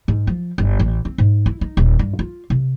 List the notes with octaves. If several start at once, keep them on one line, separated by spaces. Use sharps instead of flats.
G#2
F3
G1
A1
C4
G#2
E4
D#4
D#1
G2
F4
C3